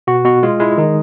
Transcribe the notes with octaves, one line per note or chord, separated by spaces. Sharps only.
B2 F#4
B2 F#4
G#3 F4
G#3 E4
D#3 D#4